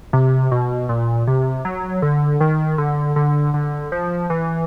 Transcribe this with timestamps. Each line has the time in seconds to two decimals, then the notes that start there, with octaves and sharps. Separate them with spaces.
0.13 C3
0.51 B2
0.89 A#2
1.27 C3
1.65 F#3
2.02 D3
2.41 D#3
2.78 D3
3.16 D3
3.54 D3
3.92 F3
4.30 E3